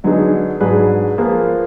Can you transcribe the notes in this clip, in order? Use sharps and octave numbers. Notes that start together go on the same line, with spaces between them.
D3 F#3 B3 D#4 G#4
G#2 F#3 D4 G#4 B4
F3 A#3 F4 G#4 B4